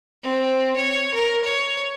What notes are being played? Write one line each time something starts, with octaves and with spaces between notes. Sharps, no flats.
C4
C#5
A#4
C#5